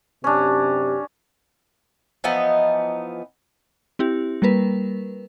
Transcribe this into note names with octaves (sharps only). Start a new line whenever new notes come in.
F#2 C3 C#4 D4 G4
E3 F3 B3 D#4
C4 E4 G4
G3 A#3 A#4 B4